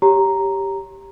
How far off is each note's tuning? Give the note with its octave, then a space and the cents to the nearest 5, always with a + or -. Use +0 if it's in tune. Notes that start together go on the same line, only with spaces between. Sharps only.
G4 +0 C#5 +0 A#5 +0